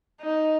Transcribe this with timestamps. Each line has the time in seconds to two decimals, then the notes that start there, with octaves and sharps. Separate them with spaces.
0.21 D#4